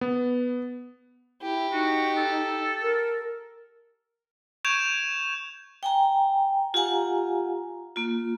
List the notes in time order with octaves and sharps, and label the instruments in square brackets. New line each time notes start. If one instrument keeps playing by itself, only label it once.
[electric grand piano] B3
[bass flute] E4 [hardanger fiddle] G4
[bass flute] D#4 [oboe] F#4
[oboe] A4
[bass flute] A#4
[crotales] C#6 G6 G#6 D7 E7 F7
[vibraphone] G5 G#5 A#5
F4 G4 F5 F#5 G#5 A#5
A#3 F4